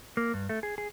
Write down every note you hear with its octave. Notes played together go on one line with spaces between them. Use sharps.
A#3
G2
A3
G#4
G#4